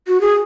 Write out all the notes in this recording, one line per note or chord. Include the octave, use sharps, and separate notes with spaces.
F#4
G#4